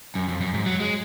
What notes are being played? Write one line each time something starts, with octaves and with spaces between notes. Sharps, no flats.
F#2
F2
F#2
G#2
F#3
G#3